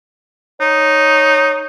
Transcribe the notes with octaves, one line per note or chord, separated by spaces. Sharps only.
D#4 C#5